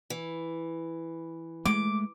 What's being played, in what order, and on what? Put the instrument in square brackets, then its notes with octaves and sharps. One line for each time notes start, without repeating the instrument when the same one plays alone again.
[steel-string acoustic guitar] E3
[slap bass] G#3 A3 [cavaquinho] D6